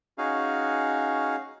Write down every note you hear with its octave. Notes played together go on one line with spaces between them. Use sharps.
C#4 D#4 F#4 G#4 F5